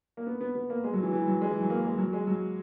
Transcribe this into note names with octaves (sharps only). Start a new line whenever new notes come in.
A#3
B3
B3
B3
A#3
G#3
F#3
E3
E3
F#3
G#3
E3
F#3
A#3
G#3
F#3
G#3
F#3